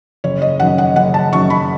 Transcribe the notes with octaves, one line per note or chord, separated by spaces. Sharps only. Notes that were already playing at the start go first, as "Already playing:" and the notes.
F#1 C#5
D#5
F#2 D#3 F#3 F#5
F#5
F#1 F#5
A5
F#2 D#3 F#3 C#6
B5